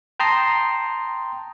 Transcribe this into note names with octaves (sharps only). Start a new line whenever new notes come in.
G5 A5 A#5 C6 D#6 C7